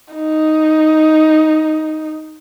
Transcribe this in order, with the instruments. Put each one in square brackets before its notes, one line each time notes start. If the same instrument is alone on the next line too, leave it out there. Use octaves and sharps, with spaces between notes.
[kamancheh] D#4